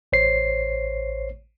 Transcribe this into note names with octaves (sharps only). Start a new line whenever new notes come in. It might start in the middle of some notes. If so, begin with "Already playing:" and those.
A1 C5 C#5 C7